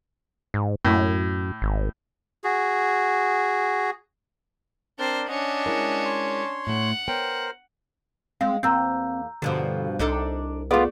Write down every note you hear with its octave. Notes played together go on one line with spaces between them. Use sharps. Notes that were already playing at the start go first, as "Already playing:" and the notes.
G#2
F#2 A2
G#1
F#4 G#4
C4 D4 A#4 C5 D5
C#4 D4 D#5 F#5
G#3 E4 A#4
C#5 C6
A2 A3 F#5
B3 A#4 C5 C#5 G5
G#3 C4 F5
E2 A#3 C4 A#5 E6 G6
G2 B2 D3 F3
C2 D4 D#4 A4
A3 B3 F4 G#4 D5